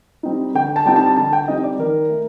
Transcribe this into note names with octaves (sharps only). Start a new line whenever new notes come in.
G3 C4 D#4
D3 G5
A5
G3 C4 D#4 G5
A5
D3 A5
G5
G3 C4 D#4 D#5
D5
D#3 A#4
A3